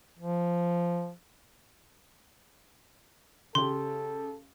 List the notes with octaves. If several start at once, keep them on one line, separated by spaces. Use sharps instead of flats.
F3
C#3 G4 A4 C6